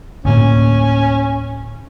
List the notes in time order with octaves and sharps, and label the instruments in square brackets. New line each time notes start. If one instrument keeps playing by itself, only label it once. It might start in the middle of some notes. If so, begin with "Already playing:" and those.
[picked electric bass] D2 A2 A#3 [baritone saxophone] C#4